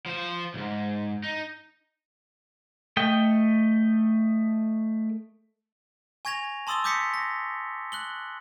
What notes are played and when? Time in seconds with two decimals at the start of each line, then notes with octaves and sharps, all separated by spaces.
0.06 F3 C5
0.54 B1 G#2
1.24 D#4
2.97 A3 D#5 G5
6.25 G#5 C#6 G#6 A#6 F7
6.67 A5 C6 D#6 E6 A6 G7
6.84 D6 D#6 G6 A#6 B6 C#7
7.14 A#6
7.92 F#6 F#7 G7